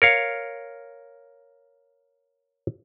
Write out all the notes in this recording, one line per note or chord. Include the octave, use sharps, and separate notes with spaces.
A#4 C#5 F5